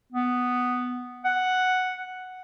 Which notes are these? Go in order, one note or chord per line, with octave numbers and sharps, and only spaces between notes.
B3
F#5